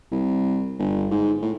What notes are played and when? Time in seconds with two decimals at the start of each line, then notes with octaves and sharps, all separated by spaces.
0.11 C2
0.79 G1
1.11 G#2
1.42 A2